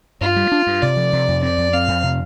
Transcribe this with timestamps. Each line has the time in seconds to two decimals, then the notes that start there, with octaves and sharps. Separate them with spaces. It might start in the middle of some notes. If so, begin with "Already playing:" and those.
0.21 G2 F4
0.36 G3
0.52 D4
0.67 G2
0.82 C3 D5
0.97 F3
1.13 C3
1.28 F2
1.43 C4 D5
1.58 F2
1.73 C4 F5
1.88 F2
2.03 C3